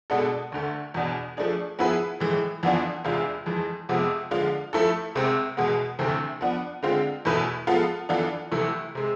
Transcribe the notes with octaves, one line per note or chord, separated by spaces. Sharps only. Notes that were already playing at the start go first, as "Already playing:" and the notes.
B2 G#3 B3 D4 A4
D2 D3 A3
E2 B2 B3 D4
F3 A3 D4 G#4
F3 B3 E4 G#4 B4
A2 E3 G#3
F2 E3 B3 D4 F4
E2 C3 G#3 D4 F4
F2 E3 G#3
F2 C3 F3 G#3 B3
D3 F3 G#3 D4 F4
F3 A3 E4 A4
C2 C3 G#3 C4
E2 B2 G#3 B3
D2 C3 E3 A3 C4
F3 B3 D4
D3 G#3 C4 F4
E2 B2 A3 E4 B4
F3 G#3 B3 F4 A4
E3 B3 D4 F4 A4
C2 C3 E3 A3 E4
C3 G#3